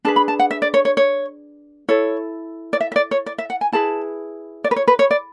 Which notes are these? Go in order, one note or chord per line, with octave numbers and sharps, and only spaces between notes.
D4 G#4 B4 A5
B5
A5
F#5
E5
D5
C#5
C#5
C#5
E4 A4 C#5
D5
E5
E5
D5
C#5
D5
E5
F#5
G#5
E4 G#4 B4 A5
D5
B4
C#5
B4
C#5
D5